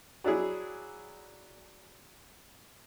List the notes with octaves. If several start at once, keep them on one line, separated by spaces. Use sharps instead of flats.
F#3 D4 E4 G#4